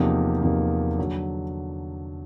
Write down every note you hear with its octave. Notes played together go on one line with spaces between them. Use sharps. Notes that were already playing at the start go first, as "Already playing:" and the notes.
Already playing: E2 C3 F3 A#3 D#4
E2 C3 F3 A#3 D#4
D3 F#3